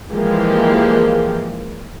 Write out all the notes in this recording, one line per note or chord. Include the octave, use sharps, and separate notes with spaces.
E3 F3 G#3 A#3 G4